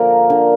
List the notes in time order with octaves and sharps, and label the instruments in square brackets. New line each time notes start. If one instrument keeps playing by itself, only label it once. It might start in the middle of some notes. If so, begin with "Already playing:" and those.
Already playing: [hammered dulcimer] D3 F3 A#3 [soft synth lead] A#4
[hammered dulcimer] D3